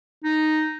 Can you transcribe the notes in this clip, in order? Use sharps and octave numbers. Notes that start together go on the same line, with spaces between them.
D#4